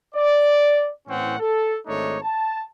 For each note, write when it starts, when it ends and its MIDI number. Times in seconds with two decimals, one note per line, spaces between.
0.15 0.90 74
1.08 1.38 45
1.08 1.38 52
1.08 1.38 60
1.08 1.38 61
1.08 1.38 78
1.39 1.76 69
1.87 2.17 32
1.87 2.17 57
1.87 2.17 62
1.87 2.17 63
1.87 2.17 73
2.21 2.64 81